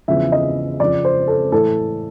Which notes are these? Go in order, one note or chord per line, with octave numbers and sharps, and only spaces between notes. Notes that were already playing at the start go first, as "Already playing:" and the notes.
E2 C#3 F3 E5
D#5
F2 C#3 F3 D5
C5
A4
A2 E3 A4